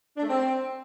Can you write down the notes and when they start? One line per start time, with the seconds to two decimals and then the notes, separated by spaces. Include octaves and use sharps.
0.16 D4
0.22 A3
0.29 C4